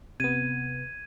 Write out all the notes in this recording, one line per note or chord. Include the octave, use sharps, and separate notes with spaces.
C3 B3 G#6 D#7